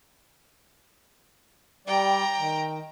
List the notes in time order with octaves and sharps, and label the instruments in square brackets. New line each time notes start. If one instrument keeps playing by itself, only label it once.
[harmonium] G3 D5 [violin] G5 A#5
[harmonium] D#3